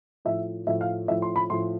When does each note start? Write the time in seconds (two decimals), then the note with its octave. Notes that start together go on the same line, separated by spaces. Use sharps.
0.25 A2 F3 E5
0.67 A2 F3 E5
0.81 F5
1.08 A2 F3 E5
1.22 C6
1.36 B5
1.50 A2 F3 C6